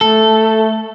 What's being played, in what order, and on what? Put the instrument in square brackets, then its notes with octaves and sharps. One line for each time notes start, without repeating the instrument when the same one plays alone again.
[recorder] A3 [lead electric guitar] A4